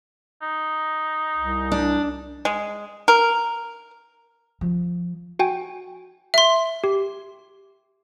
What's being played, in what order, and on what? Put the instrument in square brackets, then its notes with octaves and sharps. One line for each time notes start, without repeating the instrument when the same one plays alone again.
[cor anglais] D#4
[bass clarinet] C2
[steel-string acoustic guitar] D4
[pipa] G#3
A#4
[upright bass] F3
[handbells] F#4 G5 G#5
[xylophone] E5 C6
[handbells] G4